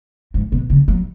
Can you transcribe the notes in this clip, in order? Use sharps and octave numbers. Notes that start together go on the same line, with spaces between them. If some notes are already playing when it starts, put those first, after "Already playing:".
G#2
B2
C#3
F#3